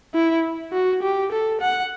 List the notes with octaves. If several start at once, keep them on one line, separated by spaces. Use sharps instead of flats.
E4
F#4
G4
A4
F#5